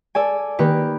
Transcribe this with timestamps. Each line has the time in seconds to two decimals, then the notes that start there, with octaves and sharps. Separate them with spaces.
0.15 A4 D5 G#5
0.59 D#3 A#3 G4 B4